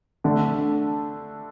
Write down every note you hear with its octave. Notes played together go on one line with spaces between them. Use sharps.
D3 A3 D4